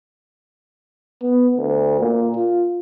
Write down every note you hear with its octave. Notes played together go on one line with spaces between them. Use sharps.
B3
D2
A#2
F4